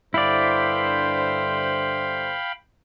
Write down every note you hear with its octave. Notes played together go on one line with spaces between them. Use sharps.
G2 D3 E4 C5 D5 F5 G5 B5